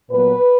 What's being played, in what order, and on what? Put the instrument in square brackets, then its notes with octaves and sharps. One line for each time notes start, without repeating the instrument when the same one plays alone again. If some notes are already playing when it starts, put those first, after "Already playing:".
[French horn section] A#2 F#3 B3 B4